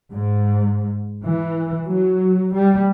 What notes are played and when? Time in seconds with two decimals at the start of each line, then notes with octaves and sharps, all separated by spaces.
0.12 G#2
1.25 E3
1.87 F#3
2.55 G3